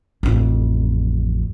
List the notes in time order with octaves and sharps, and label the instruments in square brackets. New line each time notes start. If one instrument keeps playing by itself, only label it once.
[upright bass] A1 F2